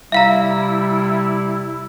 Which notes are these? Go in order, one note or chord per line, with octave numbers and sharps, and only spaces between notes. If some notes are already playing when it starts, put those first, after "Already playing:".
C3 G3 E4 E5 F5 A#5